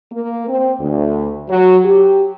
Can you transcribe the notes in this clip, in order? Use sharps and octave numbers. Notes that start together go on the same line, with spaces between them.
A#3
C4
D2
F#3
G4